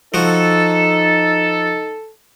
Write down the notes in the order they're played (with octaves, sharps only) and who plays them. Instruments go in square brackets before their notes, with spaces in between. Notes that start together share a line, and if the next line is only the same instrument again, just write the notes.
[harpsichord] F3 F#4 [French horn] D#4 [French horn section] A4